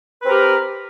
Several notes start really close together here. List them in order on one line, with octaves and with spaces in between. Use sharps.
B4 C4 A#4 G4